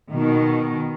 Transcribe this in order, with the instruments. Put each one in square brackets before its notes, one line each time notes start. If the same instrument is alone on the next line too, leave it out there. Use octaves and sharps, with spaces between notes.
[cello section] B2 D#3